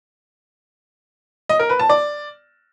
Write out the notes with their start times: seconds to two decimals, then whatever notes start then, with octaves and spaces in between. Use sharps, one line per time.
1.49 D#5
1.59 A#4
1.69 B4
1.79 A5
1.89 D5